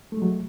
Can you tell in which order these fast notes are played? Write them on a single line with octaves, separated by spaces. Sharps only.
A3 G#3 F#3